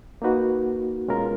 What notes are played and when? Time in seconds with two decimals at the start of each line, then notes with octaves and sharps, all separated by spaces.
0.22 A#3 D#4 F#4 B4
1.08 B2 G#3 C#4 F4 A#4